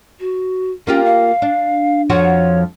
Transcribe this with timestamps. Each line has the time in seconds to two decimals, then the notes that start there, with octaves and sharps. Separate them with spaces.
0.20 F#4
0.87 A#3 C#4 F4 G4
1.04 F5
1.42 D4
2.10 F2 F3 F#4 C#5